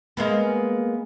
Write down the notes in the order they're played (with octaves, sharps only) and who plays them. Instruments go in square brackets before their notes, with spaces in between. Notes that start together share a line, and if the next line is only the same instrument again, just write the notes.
[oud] G#3 A#3 B3